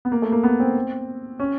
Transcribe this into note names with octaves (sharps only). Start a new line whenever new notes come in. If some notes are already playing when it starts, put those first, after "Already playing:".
B3
A#3
A3
A#3
B3
C4
C#4